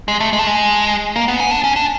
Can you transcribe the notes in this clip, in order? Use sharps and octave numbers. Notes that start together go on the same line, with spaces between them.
G#3
A3
G#3
A3
G#3
A#3
B3
C#4
D4
C#4
D4